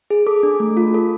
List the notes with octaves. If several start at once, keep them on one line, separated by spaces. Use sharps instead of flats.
G#4
A4 D6
D4
A3
F4
A4